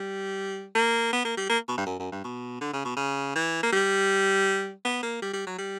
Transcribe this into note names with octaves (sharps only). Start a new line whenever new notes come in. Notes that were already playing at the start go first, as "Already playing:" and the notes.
Already playing: G3
A#3
B3
A#3
G3
A#3
B2
G2
F#2
F#2
G2
B2
D3
C#3
B2
C#3
E3
A#3
G3
B3
A#3
G3
G3
F#3
G3